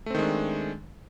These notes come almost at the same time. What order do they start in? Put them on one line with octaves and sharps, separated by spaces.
A3 C4 D#3 G#3 D4